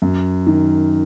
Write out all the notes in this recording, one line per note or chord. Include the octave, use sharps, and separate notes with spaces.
F#2
D#3